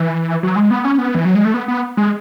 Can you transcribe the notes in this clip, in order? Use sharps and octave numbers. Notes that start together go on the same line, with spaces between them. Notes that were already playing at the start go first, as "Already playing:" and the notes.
Already playing: E3
F#3
G#3
B3
C#4
B3
E3
F#3
G#3
A3
B3
B3
G#3